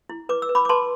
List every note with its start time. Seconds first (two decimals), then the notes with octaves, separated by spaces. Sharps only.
0.09 E4
0.29 B4 D6
0.42 E6
0.49 B4
0.55 B5 D6
0.65 D6
0.69 B4 A5 C6